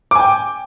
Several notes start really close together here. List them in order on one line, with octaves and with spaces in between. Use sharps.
D6 G#5 G5